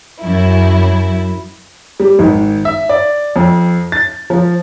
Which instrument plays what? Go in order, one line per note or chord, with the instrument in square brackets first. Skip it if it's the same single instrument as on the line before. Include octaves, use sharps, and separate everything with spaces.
[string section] F#2 E4
[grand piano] G3
G#1
E5
D5
F2
A6
F3